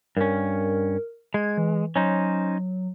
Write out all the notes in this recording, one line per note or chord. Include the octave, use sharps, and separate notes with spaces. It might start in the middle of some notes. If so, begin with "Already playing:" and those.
G2 C#4 A#4
G#3 G#6
E3
F#3 C#4 D#4 C5